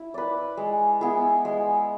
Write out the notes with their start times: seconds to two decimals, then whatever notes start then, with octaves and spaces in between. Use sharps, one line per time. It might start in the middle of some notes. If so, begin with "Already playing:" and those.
Already playing: E4
0.14 B4 D5
0.57 G#3
1.01 B3 E4 G#4
1.45 G#3